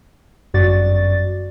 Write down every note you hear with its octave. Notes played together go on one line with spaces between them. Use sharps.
G1 F#2 F#4 D5 A6